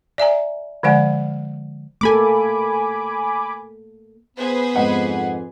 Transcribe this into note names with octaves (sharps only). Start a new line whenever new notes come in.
D5 E5 G#5 A#5
D3 F3 G#3 D5 F#5 G#5
A3 A#3 A4 G#5 B5 D6
B3 G#4 B4 C5
F2 G#2 D#4 F#5